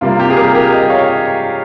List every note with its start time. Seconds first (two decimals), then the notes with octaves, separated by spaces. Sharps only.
0.01 C3 G3 A#3 F4
0.19 G4
0.30 G#4
0.37 G4 A#4
0.55 G4 A#4
0.72 D#5 G5
0.90 C#5 F5